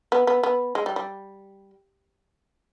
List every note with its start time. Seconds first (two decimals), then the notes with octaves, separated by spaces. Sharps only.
0.12 B3
0.27 B3
0.43 B3
0.75 G#3
0.86 G3
0.96 G3